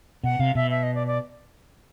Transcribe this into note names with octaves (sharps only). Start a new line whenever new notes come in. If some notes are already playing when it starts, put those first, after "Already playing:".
B2 F#5
C3 F5
B2 E5
E5
D#5
D5
D5